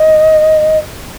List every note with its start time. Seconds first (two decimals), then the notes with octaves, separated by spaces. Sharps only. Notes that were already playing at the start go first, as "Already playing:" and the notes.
Already playing: D#5